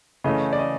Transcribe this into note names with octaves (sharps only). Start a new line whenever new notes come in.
C#3 E3 A3 C#4 D#5
D5
D#5